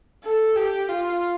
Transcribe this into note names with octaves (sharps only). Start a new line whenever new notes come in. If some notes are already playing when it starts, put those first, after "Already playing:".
A4
G4
F4